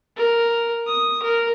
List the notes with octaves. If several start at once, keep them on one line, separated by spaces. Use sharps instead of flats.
A#4
D#6
A#4